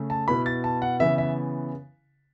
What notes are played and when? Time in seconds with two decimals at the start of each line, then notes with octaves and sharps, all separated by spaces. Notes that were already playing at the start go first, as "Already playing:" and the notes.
Already playing: C#3 A3
0.10 A5
0.28 B2 B3 E4 B5
0.46 A6
0.64 A5
0.82 F#5
0.99 C#3 E3 B3 E4 E5
1.18 E5